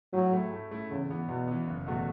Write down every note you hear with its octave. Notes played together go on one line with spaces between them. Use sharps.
A2 F#3
A3 E4
A2
A3 E4
E2 C#3
E3 B3
E2 B2
E3 B3
F#1
E2 B2 A3 F#4